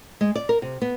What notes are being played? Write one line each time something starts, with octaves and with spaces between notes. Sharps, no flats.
G#3
D5
A#4
C3
B3